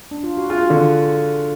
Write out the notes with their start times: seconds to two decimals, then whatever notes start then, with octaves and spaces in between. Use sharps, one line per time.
0.11 D4
0.24 F4
0.37 F#4
0.50 F4 G#4
0.63 F#4
0.70 D3